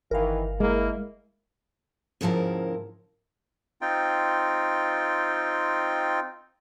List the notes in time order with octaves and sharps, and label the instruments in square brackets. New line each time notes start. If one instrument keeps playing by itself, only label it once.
[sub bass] G1 [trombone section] D#3 E3 [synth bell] A#4 F5
[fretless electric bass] G#3 [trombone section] A#3 E4
[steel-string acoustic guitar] D#2 G#2 C#3 F3 E4 A#4
[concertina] C4 D#4 F4 G5